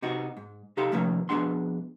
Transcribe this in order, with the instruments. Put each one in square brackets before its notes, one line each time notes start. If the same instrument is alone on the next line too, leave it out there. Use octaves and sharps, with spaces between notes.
[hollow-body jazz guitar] C3 D#4 F#4
G#2
C3 D#4 G4 A4 F5 C6
C3 D#3 F3 A3 A#3 C#4
F2 B2 G#3 D4 F#5 C6